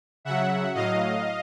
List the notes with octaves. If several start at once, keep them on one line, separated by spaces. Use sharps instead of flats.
C#3 F#3 E5 F#5
A2 F#3 D#5 F5